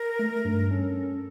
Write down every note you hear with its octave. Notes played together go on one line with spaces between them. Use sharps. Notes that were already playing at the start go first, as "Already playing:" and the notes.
Already playing: A#4
A3
G2
C#4 A4